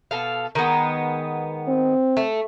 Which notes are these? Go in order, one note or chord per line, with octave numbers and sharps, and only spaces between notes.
B2 A4 F5
D#3 G#3 B3
C4
A3